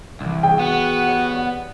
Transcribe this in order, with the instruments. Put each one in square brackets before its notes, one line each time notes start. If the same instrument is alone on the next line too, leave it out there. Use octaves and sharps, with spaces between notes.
[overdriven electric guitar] C2 [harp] E3 E7
[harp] G#4 C#5 D#5 [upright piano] G5
[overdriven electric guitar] B3 [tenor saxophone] F#4
[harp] G4 C#5 D#5
D5 F#5